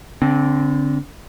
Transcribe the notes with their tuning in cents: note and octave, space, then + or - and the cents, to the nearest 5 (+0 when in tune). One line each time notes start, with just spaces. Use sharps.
D3 -25 C4 +0